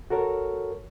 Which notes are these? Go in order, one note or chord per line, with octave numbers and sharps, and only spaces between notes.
F#4 A4 A#4 C#5